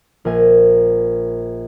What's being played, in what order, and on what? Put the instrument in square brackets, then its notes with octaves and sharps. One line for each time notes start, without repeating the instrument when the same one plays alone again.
[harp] A#1 A#4 G#5